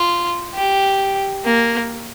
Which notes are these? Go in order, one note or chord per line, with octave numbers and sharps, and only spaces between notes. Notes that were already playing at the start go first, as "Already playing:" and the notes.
Already playing: F4
G4
A#3